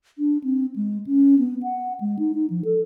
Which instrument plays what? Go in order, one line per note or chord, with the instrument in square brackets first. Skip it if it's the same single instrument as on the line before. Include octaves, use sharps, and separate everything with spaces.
[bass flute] D4
C4
G#3
C#4
B3
F#5
G#3
D#4
D#4
F3
A4